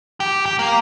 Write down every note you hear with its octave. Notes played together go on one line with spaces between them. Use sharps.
G4
G4
A#3